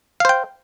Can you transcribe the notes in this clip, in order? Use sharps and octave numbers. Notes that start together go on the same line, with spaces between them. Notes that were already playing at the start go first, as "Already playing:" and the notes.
C5 F5 G5